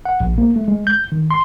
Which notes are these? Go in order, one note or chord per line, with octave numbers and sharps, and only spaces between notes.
F#5
A#1
A#3
A3
G#3
G6
D#3
C6